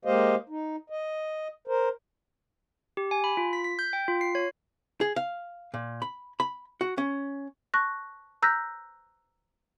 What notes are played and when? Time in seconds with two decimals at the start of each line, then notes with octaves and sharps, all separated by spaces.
0.05 G#3 A#3 G4 C5 D#5 F5
0.49 D#4
0.90 D#5
1.68 A#4 C5
2.97 G4
3.11 G#5
3.24 B5
3.37 F4
3.53 B6
3.64 B6
3.79 G6
3.93 G5
4.08 F4
4.21 C7
4.35 C#5
5.01 G#4
5.16 F5
5.74 A#2
6.02 B5
6.40 B5
6.81 F#4
6.98 C#4
7.74 A5 C#6 F#6 A#6
8.42 A#5 E6 F#6 G6 A#6 B6